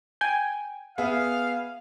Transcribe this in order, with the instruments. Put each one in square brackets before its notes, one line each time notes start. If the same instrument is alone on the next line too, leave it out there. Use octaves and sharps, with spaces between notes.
[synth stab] G5 G#5
[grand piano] B3 G#4 E5 [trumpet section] F5